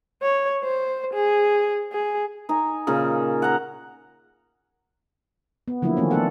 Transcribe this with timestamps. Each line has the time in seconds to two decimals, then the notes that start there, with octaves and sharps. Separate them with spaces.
0.23 C#5
0.64 C5
1.14 G#4
1.92 G#4
2.49 D#4 G#5 A#5
2.87 A#2 C#3 D#4
3.42 F#5 A#5
5.68 B3
5.82 D3 F3 F#3 A#3 E4
5.97 D#3 F3 A3 A#3 C4 C#4
6.11 A3 B3 D4 F4 A4 F#5